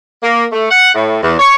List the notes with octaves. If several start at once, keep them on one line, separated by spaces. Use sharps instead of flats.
A#3
A3
F#5
A2
E2
C#5